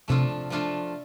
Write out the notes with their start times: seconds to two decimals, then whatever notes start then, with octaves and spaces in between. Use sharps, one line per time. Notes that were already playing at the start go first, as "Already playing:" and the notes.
0.08 C3 F3 A3 D4 F4 A4
0.50 F3 A3 D4 F4 A4